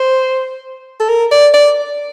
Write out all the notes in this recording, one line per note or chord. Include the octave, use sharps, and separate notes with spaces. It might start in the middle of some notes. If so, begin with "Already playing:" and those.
Already playing: C5
A4
A#4
D5
D5